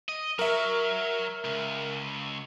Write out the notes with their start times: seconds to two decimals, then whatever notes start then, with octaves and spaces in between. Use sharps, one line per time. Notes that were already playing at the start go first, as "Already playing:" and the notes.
0.09 D#5
0.39 F#3 A#4 E5
1.44 C#2